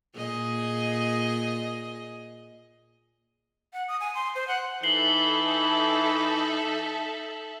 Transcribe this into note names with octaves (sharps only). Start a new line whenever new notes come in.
A#2 G#4 D#5
F#5
D#6
G#5
C6
C5
F#5
E3 D#4 A4 E5 C7 F#7 G7